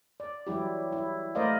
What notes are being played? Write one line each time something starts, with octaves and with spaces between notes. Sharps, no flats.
D5
E3 F#3 G3 E4 G4
E4
A3 A#4 C5 D5 D#5 F5